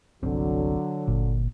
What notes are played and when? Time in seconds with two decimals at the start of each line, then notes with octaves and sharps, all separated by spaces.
0.23 G1 C2 D3 F#3 C4
1.08 G1 A#2